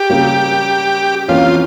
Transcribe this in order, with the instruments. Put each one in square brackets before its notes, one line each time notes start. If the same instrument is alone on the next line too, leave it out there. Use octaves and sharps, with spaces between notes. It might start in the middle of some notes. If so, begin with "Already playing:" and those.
Already playing: [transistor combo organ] G4
[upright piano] C#3 G3 A#3
[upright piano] F2 E3 A#3 C#4 [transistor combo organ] F4